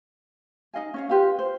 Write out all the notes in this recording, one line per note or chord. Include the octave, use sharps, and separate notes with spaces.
D#4 D#5 F5 G#5
C#4 C#5 F5
F4 G4 B4 F5
C5